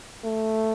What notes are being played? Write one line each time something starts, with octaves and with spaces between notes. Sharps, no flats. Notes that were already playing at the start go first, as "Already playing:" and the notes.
A3